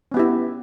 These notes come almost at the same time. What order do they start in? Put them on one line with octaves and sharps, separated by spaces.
C#4 B3 G4 E4